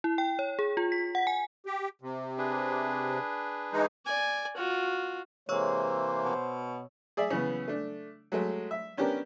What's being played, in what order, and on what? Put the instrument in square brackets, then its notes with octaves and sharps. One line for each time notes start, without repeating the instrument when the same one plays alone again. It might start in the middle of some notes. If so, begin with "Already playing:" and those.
[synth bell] E4
G5
C#5
G#4
F4
B6
F#5
G#5
[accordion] G4
C3
[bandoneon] D4 G#4 B4
[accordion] E3 G#3 D#4
[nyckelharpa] D5 G#5
F4 F#4
[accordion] C3 E3 A#3 [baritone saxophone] G#3 [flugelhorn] C5 [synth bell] C#5 C#6 E6
[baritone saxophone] B2
[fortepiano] G#4 D5 E5
C#3 E3 B3
A3 D4
F#3 G#3 A3
E5
B3 C#4 D4 G4 A#4